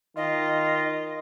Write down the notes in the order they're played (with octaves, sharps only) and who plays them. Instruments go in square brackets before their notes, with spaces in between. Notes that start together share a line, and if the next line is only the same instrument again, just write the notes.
[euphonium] D#3 [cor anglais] F4 [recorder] D#5